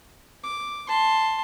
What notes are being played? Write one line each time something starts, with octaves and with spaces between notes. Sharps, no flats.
D6
A5 C6